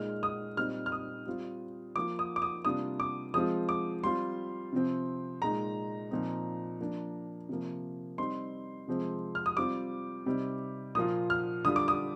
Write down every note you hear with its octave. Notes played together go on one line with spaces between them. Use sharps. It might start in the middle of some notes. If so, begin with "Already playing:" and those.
Already playing: A#2 G#3 D#4 F6
D#6
A#2 G3 C4 D#4 F6
F6
D#6
G3 C4 F4
F3 A#3 F4 D6
D#6
D6
D#6
C3 G3 A#3 D4 F4 D#6
D6
F3 G#3 C4 F4 D#6
D6
G3 C4 F4 C6
C3 F3 C4
A#2 G#3 D#4 A#5
A#2 F3 C4 D#4
F3 A#3 D4
C3 F3 A#3
G3 C4 D#4 C6
C3 F3 G#3 C4
F6
D#6
G3 C4 F4 D6
C3 G3 C4 D#4
A#2 F3 A#3 F4 D#6
F6
D3 G3 D4 F4 D#6
D6
D#6